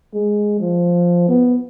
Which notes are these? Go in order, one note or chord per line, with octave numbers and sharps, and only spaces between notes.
G#3
F3
B3